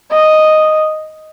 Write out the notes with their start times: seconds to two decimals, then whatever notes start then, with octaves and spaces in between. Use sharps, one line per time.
0.10 D#5